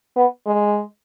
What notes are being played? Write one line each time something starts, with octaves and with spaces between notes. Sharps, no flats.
B3
G#3